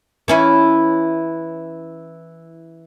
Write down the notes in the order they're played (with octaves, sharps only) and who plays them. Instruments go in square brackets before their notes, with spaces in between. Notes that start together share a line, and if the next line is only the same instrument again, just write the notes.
[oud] E3 C#4 E4